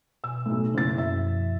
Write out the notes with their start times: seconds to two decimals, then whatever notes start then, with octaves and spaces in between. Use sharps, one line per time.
0.24 B2 G#5 E6
0.46 B1 A2
0.74 F#1 E4 A6
0.98 F#2 E5
1.16 F3